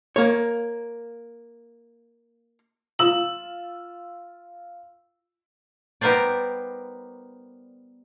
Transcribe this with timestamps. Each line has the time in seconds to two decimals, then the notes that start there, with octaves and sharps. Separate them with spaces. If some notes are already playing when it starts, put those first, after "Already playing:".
0.16 A#3 C#5
2.99 F4 E6 F#7
6.01 G3 B3 D#4 A#4 C5 D5